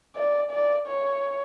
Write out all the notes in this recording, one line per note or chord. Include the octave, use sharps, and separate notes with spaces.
D5
D5
C#5